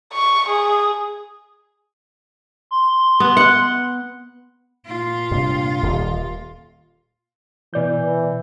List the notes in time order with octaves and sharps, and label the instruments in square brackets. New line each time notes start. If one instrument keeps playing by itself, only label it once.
[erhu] C#6
G#4
[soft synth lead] C6
[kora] B3
F#5
[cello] A#2 F4
[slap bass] G2 C3
D#1
[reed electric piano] B2 D5 G6 [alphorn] E3